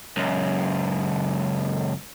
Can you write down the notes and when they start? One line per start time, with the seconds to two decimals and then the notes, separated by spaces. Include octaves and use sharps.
0.17 C#2 F#2